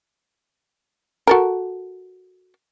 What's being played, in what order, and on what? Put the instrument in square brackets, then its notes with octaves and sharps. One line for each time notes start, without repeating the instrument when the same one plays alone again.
[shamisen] F#4 A4 A#4